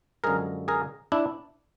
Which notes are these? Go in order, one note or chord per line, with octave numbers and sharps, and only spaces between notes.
F#2 D3 F3 G#3 G#4 A#4
G#4 A#4
D4 E4